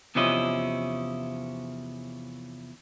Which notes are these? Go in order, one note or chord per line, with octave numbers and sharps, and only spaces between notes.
E2 C3 F3 C#4 E4 D#5